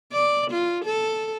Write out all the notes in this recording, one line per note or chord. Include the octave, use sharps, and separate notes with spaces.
D5
F4
A4